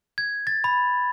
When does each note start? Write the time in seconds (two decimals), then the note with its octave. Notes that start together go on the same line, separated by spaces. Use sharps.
0.18 G#6
0.47 A6
0.64 B5